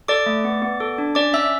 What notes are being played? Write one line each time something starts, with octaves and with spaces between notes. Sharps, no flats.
A4 D5 D6
A3
B3
B3
A4
D4
C#4 D5 D6
C#4 E5 E6